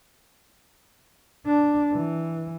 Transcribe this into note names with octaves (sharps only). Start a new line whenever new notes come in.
D4
E3